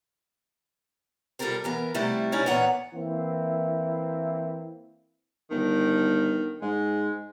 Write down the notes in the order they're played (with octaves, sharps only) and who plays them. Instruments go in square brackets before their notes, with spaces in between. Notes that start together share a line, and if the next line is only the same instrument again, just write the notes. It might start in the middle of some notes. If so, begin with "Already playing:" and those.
[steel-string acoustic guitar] G3 F4 G4 A4 A#4 C5
E3 B3 A#4
C3 G3 A3 E4
C#4 D#4 E4 C#5 D5
A#2 E3 B3 C#5 F#5 A#5
[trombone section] E3 A#3 C4 E4
[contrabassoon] G1 [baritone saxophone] D#3
[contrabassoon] G#2 [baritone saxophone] G#3